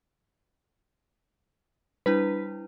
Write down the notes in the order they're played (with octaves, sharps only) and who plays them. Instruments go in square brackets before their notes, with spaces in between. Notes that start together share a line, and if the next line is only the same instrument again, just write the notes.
[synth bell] G3 D4 E4 [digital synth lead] B4